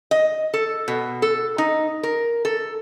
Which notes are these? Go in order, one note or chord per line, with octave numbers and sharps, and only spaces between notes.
D#5
A4
B2
A4
D#4
A#4
A4